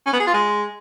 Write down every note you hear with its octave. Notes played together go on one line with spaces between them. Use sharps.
C#4
B3
G#4
F4
G#3